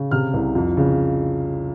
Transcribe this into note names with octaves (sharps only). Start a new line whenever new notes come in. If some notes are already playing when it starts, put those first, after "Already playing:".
Already playing: C#3
C3 F6
C2
F2
C#3